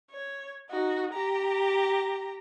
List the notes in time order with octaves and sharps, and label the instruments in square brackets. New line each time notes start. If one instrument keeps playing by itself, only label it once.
[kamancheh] C#5
D#4 F#4
G4 A#5